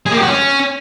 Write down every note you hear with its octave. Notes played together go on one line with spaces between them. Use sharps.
G#4
A#3
G4
F#4
C#4